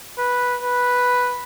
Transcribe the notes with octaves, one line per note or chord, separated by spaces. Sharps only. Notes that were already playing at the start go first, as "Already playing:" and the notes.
B4
B4